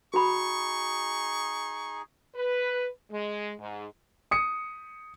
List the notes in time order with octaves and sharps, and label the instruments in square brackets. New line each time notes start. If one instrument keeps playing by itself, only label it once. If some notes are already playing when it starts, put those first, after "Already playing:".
[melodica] D#4 G#4 [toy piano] F#4 B5 [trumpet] C#6
[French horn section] B4
G#3
G#2
[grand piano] D#6 C#7